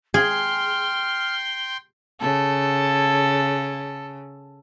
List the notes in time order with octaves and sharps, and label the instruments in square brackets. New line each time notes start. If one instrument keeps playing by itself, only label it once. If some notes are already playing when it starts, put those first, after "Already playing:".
[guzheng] G#4 [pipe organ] G5 C6 [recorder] F6
[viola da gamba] C#3 [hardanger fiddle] A4